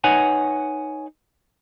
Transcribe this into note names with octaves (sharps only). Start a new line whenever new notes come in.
D#4 B4 C#5 F#5 G#5